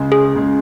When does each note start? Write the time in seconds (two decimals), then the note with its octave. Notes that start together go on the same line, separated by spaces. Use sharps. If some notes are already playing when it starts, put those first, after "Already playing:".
Already playing: C#2 C#3 G#3
0.12 G#4
0.35 C#2 C#3 G#3